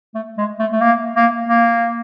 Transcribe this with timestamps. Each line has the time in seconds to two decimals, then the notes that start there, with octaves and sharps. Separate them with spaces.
0.14 A3
0.38 G#3
0.59 A3
0.72 A3
0.81 A#3
1.16 A#3
1.49 A#3